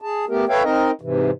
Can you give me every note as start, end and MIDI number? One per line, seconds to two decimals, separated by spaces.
0.02 0.25 68
0.02 0.25 81
0.29 0.45 57
0.29 0.45 59
0.29 0.45 67
0.29 0.45 70
0.49 0.63 69
0.49 0.63 71
0.49 0.63 73
0.49 0.63 76
0.49 0.63 77
0.49 0.63 79
0.63 0.91 60
0.63 0.91 63
0.63 0.91 70
0.63 0.91 75
1.01 1.31 44
1.01 1.31 48
1.01 1.31 52